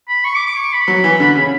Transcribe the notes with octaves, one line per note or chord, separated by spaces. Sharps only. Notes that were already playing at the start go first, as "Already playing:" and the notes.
B5
C#6
D6
D6
C#6
B5
F#3
E3
D3
C#3